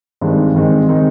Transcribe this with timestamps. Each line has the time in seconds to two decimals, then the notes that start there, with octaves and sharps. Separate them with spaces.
0.21 G2 D#3 G#3 C4 D#4
0.54 G2 D#3 G#3 C4 D#4
0.88 D#3 G#3 C4 D#4